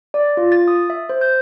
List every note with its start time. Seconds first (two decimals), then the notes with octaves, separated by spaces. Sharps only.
0.14 D5
0.37 F4
0.52 A6
0.68 D#6
0.90 E5
1.09 C5
1.21 G6